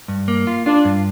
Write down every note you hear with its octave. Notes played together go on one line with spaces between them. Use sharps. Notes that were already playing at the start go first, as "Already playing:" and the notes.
G2
A#3
F4
D4 F4
G2